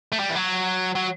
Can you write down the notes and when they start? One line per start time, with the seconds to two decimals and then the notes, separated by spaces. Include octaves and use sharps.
0.12 A3
0.19 G3
0.30 E3
0.36 F#3
0.95 F#3